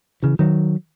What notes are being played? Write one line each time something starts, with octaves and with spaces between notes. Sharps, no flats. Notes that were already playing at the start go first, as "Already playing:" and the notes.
C#3 E3
D#3 F#3